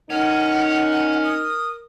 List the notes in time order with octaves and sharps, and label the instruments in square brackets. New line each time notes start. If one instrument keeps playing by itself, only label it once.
[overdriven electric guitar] C#4 [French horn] D#4 [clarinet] A#4 [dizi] F#5
[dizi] D#6